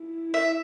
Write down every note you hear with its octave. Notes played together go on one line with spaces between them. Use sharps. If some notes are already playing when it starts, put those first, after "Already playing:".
Already playing: E4
E5